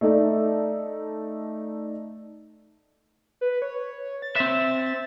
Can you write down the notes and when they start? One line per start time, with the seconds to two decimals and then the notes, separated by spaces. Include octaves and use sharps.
0.01 A3 D#4 A4 D5
3.41 B4
3.62 C#5
4.22 A6
4.36 C4 E5